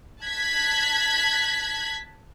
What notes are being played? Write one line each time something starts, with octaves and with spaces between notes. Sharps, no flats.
A5 F#6 G#6 B6